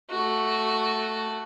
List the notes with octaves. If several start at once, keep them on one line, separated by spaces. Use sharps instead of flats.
A3 F#4